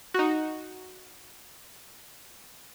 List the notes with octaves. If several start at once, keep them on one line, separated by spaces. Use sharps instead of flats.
D#4 F#4